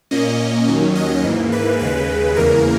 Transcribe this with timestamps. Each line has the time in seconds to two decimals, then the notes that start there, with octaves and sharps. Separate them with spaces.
0.11 A#2 A#3 C#4 D#5
0.68 D#2 D#3 F#3 C#4
0.95 D#5
1.24 G#2 E3 A#3
1.52 B4
1.80 D#2 C#3 G#3 B4
2.36 E2 C#3 E3 A#3 A#4